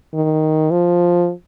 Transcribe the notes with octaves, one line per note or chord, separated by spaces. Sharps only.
D#3
F3